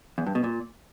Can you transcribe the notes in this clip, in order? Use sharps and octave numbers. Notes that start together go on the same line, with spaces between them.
E2
G2
B2
A#2